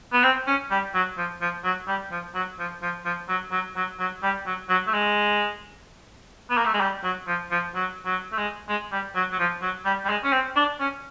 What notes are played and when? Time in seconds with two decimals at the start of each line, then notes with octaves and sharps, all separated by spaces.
0.13 B3
0.24 C4
0.47 C#4
0.71 G3
0.95 F#3
1.18 F3
1.41 F3
1.64 F#3
1.88 G3
2.12 F3
2.35 F#3
2.59 F3
2.82 F3
3.05 F3
3.29 F#3
3.52 F#3
3.76 F#3
4.00 F#3
4.23 G3
4.46 F#3
4.69 F#3
4.87 A3
4.93 G#3
6.50 B3
6.57 A#3
6.66 A3
6.74 G#3
6.81 G3
7.04 F#3
7.27 F3
7.51 F3
7.75 F#3
8.06 F#3
8.32 A3
8.38 G#3
8.69 G#3
8.92 G3
9.16 F#3
9.32 F#3
9.39 F3
9.62 F#3
9.86 G3
10.05 G3
10.09 G#3
10.24 C#4
10.32 C4
10.57 D4
10.80 C#4